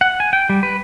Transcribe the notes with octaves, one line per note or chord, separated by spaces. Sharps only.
F#5
G#5
G5
G3
B4